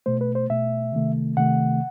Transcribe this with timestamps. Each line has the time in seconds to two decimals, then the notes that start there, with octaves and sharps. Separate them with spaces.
0.06 B2 A3 C5
0.21 B4
0.35 C5
0.50 B2 A3 E5
0.93 C3 D#3 A3
1.37 C3 D#3 A3 F#5